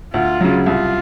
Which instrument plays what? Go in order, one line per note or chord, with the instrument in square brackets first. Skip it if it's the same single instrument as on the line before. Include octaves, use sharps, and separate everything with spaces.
[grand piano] D2 [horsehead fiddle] F4
[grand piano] C#3 F#3
[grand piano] C2 [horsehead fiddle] F4